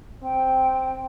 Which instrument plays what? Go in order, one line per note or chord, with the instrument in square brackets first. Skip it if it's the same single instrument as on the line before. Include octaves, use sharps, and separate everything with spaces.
[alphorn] C4 [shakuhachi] G5